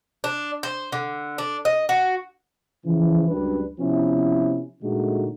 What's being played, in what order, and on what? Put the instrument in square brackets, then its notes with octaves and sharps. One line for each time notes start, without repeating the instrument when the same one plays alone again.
[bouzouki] D4
C5
D3
D4
D#5
F#4
[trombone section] C#3 E3 F3
C#2 F#2 G3 D4 B4
C3 F3 B3 C#4 E4
A#2 D3 G#3 A3 D#4 F#4